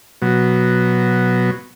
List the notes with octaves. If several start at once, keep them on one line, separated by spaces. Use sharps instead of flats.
B2 F#3